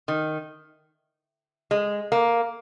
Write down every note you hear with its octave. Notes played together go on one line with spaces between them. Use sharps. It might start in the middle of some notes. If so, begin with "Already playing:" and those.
D#3
G#3
A#3